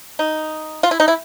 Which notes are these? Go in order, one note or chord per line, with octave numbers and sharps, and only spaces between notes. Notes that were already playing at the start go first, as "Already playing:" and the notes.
D#4
F4
E4
D#4
E4